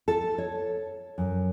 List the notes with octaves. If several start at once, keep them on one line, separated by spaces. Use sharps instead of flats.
A4
C#5
F#2